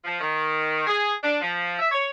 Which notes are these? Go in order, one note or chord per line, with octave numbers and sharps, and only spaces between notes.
F3
D#3
G#4
D4
F3
E5
C#5